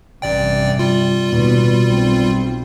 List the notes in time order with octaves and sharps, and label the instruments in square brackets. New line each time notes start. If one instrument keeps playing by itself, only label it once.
[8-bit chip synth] A1 D5 G5 [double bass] G2 C3
[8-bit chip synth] G3 F4
[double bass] D#2 B2
B1 C4